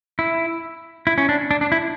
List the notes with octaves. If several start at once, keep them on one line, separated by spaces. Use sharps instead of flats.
E4
E4
C#4
D4
D4
D4
E4